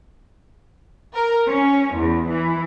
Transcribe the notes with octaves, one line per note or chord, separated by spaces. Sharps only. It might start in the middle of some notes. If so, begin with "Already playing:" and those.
A#4
C#4
E2
E3